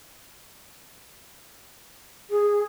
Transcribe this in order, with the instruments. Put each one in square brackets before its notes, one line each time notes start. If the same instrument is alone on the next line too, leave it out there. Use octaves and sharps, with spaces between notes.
[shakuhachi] G#4